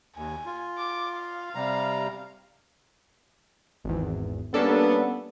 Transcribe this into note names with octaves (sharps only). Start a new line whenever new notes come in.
D#2 G#5
F4
D6
F5
C3 G3 A#5
G#1 E2
G3 A#3 B3 C#4 D4 A4